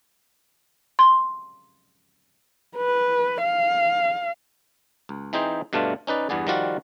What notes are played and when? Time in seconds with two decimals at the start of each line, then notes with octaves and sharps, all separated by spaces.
0.99 C6
2.77 B4
3.43 F5
5.09 C#2
5.33 E3 C4 D#4 G#4 C5
5.73 G2 B2 A3 D4 F4
6.07 C#4 D#4 B4 D5
6.29 E2 G2 B3 G#4 D5
6.47 D#3 F3 G3 F4 F#4 D5